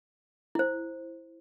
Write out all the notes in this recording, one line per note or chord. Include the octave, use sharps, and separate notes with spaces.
E4 C5